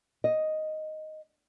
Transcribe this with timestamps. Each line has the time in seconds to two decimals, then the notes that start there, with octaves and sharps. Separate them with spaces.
0.24 D#5